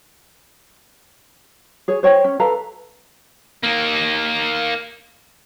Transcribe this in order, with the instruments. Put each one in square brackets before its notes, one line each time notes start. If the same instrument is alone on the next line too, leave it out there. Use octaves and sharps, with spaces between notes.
[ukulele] G#4 C#5
C5 C#5 G5
C#4
A4 B4 F5 A#5
[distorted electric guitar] A#3 D#4